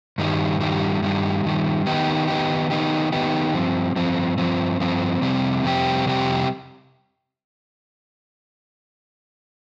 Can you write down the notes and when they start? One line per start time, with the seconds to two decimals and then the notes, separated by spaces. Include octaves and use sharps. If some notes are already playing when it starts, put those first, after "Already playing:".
0.18 G2 D#3 G3
0.61 G2 D#3 G3
1.02 G2 D#3 G3
1.44 G2 D#3 G3
1.86 D#3 B3 D#4 G4
2.28 D#3 B3 D#4 G4
2.70 D#3 B3 D#4 G4
3.12 D#3 B3 D#4 G4
3.54 G2 F3 C4
3.96 G2 F3 C4
4.38 G2 F3 C4
4.80 G2 F3 C4
5.22 F2 C3 G3 C4 G4
5.64 F2 C3 G3 C4 G4
6.05 F2 C3 G3 C4 G4